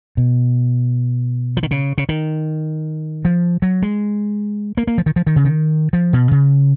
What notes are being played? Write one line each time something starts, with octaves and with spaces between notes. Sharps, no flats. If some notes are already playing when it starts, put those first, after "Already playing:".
B2
F3
D#3
C#3
C#3
D#3
F3
F#3
G#3
A#3
A#3
F3
D#3
F3
D#3
C#3
D#3
F3
B2
C#3